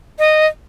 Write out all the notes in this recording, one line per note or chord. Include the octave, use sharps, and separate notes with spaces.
D#5